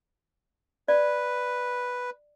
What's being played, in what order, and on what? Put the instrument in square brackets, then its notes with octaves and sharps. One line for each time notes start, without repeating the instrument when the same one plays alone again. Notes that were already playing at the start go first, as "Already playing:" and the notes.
[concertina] B4 [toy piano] D5